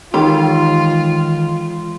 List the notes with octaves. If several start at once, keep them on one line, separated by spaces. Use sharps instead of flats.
D#3 E3 G#3 F4 G4 C6